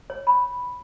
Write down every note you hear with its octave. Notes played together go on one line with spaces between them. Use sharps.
C#5
B5